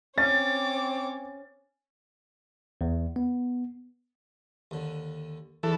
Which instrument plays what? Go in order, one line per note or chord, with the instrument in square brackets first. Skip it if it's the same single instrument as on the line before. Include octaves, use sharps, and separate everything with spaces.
[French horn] C4 [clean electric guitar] C#4 [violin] C#5 D6 [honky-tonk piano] A6
[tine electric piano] E2
B3
[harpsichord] D#2 D3
[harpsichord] E2 [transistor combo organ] E3 A4